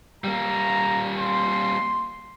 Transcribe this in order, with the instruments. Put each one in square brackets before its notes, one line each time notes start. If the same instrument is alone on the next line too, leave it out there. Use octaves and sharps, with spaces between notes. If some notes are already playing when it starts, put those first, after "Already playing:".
[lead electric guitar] G3 A#3 [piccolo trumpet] A#5
[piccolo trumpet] C6